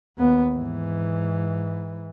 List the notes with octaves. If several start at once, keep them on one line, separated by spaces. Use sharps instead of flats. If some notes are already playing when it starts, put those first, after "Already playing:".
D#2 B3
G#2 E3